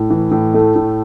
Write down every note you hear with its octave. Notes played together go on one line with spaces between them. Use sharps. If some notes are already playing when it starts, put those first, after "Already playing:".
Already playing: A2
E3
A2
A3
A2